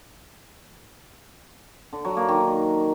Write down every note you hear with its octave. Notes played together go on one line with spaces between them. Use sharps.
D3
F#3
A#3
D#3